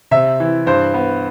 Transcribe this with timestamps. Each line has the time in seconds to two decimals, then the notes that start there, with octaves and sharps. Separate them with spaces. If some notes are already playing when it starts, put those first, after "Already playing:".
0.11 C3 E5
0.40 E3
0.66 G2 C5
0.94 B3